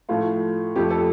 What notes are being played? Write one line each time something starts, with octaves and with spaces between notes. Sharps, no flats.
A2 F3 A3 F4
F2 F3 A3 G4
A4